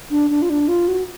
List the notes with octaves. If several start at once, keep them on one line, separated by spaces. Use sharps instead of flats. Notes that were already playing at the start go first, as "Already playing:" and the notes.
D4
D4
F4
D4
F4
F#4